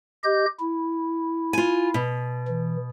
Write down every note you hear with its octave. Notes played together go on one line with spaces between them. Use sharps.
G4 D#5 G6
E4
F4 G#5
B2
E3